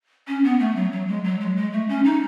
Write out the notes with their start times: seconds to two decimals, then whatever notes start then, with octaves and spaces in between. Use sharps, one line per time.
0.28 C#4
0.44 B3
0.60 A3
0.76 F#3
0.92 F#3
1.08 G#3
1.24 F#3
1.41 G#3
1.56 G#3
1.73 A3
1.89 C#4
2.05 D#4